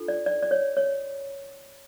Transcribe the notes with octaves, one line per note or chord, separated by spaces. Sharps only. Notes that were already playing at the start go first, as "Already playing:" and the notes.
Already playing: D4 F4 A4
D5
D5
D5
C#5
C#5